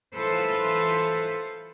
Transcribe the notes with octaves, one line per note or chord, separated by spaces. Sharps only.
E3 F4 A4 B4 C5